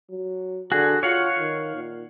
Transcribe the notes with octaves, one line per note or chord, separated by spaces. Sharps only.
F#3
D3 F#4 G#4
F4 C#5 F5 F#5
D#3
A#2